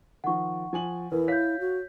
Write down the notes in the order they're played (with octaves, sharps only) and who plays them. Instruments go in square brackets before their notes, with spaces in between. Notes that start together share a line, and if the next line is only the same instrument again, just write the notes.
[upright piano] D#3 F3 [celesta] F#5 C#6
[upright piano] F3 G#5 F#7
[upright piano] E2 [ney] E4 [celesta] A#4 B4
[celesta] C#5 G6 [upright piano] F5 B6
[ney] F#4